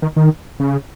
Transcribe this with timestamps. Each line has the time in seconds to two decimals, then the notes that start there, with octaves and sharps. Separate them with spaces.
0.02 D#3
0.16 D#3
0.60 C#3